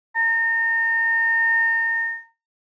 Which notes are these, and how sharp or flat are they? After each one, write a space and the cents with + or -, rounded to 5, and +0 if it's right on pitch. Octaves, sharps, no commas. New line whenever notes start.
A#5 -35